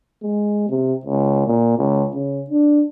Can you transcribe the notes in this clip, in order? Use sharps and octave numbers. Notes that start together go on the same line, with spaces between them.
G#3
C3
C#2
A#2
C#2
C#3
D4